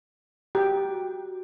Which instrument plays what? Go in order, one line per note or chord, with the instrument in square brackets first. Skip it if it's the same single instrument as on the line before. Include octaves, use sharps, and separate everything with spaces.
[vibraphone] F#4 [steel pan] G4 G5